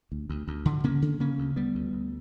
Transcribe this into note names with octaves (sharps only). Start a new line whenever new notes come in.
D2
D2
D2
D3
C#3 A#3 C#4
C#3
C#3 A#3 C#4
D2
D2 G3 B3
D2
D2